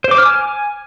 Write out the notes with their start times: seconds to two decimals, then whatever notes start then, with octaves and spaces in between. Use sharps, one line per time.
0.04 C5
0.11 D6
0.18 F6
0.25 G#5